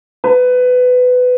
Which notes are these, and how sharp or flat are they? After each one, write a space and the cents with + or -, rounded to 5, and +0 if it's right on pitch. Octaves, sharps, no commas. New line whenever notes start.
B4 +20